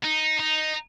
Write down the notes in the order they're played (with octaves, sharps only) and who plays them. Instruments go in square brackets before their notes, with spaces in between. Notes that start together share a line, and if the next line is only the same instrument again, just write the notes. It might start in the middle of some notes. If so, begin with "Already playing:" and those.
[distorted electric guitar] D#4
D#4